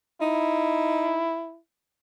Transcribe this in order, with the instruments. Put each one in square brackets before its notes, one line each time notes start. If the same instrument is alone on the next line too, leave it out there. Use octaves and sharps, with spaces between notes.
[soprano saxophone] D#4 [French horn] E4